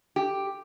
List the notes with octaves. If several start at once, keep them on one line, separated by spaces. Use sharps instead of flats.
G4